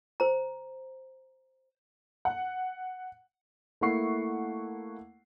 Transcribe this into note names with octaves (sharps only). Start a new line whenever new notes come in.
C5 A#5
F#5
A3 A#3 E4 F#5 C#6 C7